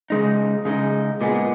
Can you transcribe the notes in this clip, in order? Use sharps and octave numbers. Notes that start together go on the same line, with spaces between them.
C#3 G#3 D#4
C#3 G#3 D#4
A#2 G#3 B3